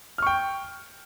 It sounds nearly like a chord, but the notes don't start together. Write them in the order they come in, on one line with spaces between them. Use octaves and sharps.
F6 C#6 G5